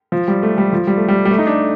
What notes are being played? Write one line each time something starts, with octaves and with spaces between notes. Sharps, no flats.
F3
G3
A3
G3
F3
G3
A3
G3
G3
A3
D#4
D4